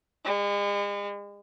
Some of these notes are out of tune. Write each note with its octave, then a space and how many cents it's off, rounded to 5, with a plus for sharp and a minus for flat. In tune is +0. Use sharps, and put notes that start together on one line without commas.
G#3 -40